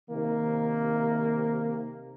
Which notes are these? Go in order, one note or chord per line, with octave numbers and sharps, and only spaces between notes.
C3 D#3 A#3